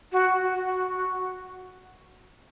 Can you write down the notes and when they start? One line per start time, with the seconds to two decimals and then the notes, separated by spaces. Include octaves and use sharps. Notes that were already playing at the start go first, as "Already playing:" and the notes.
0.12 F#4
0.54 F#4